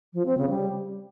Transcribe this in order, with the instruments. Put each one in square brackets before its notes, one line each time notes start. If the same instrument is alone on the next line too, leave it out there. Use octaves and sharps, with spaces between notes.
[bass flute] F3
C4
C#3
G3